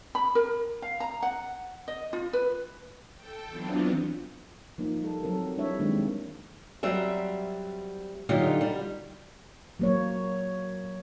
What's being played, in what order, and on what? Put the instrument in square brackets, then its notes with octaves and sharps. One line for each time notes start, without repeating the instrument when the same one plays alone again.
[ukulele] B5
A#4
F5
A#5
F#5
D#5
F4
B4
[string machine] A4 G5
E3 F#3 B3 C4 D4 F4
[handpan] F3 A#3 D#4
G3 A4
F#3 C4 A4 A#4
G3 D4 E4 C#5 E5
D#3 F#3 G#3 A#3 C4 D4
[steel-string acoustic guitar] F#3 G3 C4 E5
D3 F#3 D#4 F4 G4
G3
[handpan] F#3 A#3 C#5